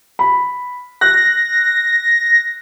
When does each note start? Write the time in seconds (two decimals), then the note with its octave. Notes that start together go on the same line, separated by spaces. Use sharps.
0.19 B5
1.01 F#6 A#6